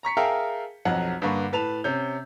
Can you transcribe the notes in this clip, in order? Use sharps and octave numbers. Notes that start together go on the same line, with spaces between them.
A#5 C#6 B6 C#7
G#4 A#4 E5 F5 G5 A5
B1 F2 F#3 F#5
G2 D3 A#3 B4 C#6
A2 B4 A5 F7
C3 C#4 G6